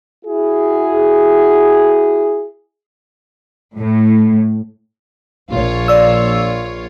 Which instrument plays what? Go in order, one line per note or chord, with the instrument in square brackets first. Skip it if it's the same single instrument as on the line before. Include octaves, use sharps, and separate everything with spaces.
[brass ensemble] E4 F#4 G#4
[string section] A2
A#1 F4 C#5
[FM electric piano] D5 E6